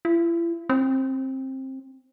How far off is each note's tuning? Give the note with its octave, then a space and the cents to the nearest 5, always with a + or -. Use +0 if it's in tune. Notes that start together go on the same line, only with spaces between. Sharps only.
E4 +40
C4 +20